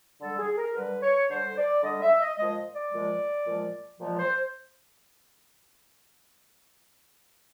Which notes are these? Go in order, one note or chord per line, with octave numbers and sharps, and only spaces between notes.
D3 G3 A4
G#4
A#4
D3 G3 B4
C#5
D3 G3 C5
D5
D3 G3 D#5
E5
D#5
A#2 F3 G#3 D#5
D5
A#2 F3 G#3
A#2 F3 G#3
A#2 F3 G#3
C5